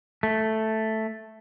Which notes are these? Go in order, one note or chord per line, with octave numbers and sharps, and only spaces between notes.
A3